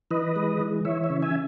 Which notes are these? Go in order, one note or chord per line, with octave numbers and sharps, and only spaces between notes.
E3 B4 D#5
G#3
E3
E3 C#5 E5
C#5 E5
C#3
E5 G#5